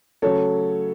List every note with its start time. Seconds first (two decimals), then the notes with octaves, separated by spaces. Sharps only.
0.22 C#3 F#3 A3 A4 C#5